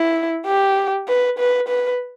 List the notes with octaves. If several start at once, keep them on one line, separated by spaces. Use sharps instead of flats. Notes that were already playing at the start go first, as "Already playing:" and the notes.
Already playing: E4
G4
B4
B4
B4